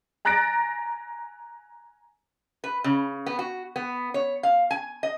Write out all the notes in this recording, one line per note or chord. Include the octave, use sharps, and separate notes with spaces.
G#5 A#5 F#6 A6 A#6 D7
B4
C#3
B3
F#4
B3
C#5
F5
G#5
D#5